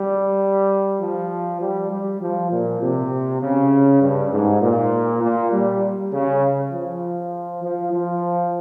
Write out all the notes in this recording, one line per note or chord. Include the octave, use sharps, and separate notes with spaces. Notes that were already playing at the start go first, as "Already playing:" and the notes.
Already playing: G3
F3
G3
G3
F3
A#2
C3
C#3
G2
G#2
A#2
A#2
G3
C#3
F3
F3
F3